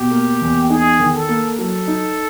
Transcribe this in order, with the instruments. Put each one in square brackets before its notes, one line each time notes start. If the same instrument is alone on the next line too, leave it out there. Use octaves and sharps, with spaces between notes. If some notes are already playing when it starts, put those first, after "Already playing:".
Already playing: [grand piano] B2 [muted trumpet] G4
[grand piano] A#3
E2
[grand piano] D#4 [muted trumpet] G#4
[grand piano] D#3
[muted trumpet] A4
[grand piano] A#3
[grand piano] F#3 [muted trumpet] A4
[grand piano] D#4